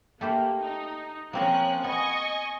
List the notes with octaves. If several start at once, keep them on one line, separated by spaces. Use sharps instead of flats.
A3 A#3 G4 C5
D#4
F3 A#3 C4 C#4 A#4 F#6
B3 D#5 G#5 C#6